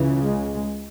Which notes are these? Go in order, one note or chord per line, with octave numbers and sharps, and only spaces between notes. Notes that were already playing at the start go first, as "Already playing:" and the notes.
Already playing: C#2 C#3 E3
G#3